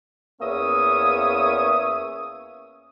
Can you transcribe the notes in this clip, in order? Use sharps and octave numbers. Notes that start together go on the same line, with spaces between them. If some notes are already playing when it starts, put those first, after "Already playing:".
E2 A#3 C#4 E5 D#6